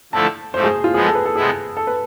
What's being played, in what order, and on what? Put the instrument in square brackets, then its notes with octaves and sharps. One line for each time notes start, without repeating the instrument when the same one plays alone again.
[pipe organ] D3 F3 A3 E4 A4 [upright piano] A5
[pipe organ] G#2 F3 A3 [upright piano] C5
[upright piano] G#4
F4
[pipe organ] F3 G#3 B3 [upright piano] G#4
[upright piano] A4
B4
A4
[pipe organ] C3 G#3 B3 E4 [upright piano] G#4
[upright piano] A4
B4